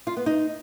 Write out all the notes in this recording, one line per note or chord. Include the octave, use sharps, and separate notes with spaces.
F4
B3
D#4